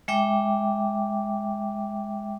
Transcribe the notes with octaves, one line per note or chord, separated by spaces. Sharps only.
G#3 E5 G5 D6